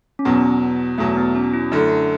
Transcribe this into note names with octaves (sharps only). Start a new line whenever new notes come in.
C#4
E2 B2 F#3 B3
E2 B2 F#3 A3
B3
C#4
E4
F#2 D3 A3 E4
D4